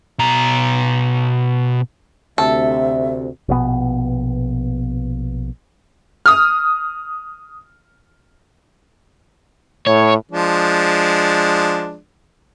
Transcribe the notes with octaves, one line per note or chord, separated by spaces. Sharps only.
B2 A#5
D2 C3 A4 E5
A#1 B2 B3
D#6 F6
A2 C#5
F3 G#3 D4